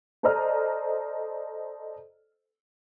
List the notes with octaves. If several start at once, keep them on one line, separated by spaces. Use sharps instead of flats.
A4 C5 D5 D#5 A#5 F6